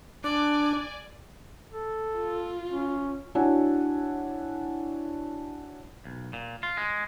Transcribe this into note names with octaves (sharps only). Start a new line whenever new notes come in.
D4 D5 G#5 D6
A4
F4
C#4
D4 E4 F#4 C#5 F#5 G#5
B1
A#2
F4
G#3